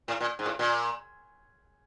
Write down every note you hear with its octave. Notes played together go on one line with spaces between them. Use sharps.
A2
A#2
G#2
A2
A#2